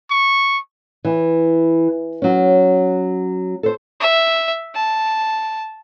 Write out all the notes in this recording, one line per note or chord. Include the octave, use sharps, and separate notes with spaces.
C#6
E3
F#3 C#4
A4 C5
E5
A5